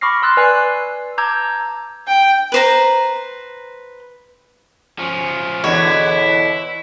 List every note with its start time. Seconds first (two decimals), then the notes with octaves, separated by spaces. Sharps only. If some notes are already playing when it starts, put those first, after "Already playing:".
0.01 B5 C#6 D6 F6 A#6 C7
0.22 C6 E6 F#6 A6
0.37 B4 D5 G#5 E6 C7
1.18 A5 A#5 D6 E6 G6 G#6
2.07 G5
2.52 B4 C5 A#5
4.99 F3 C#4
5.64 E2 B2 D3 E4 C#5